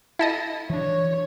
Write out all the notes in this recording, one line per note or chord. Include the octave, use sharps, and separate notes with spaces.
E4 A4 D#5
E3 D4 C#5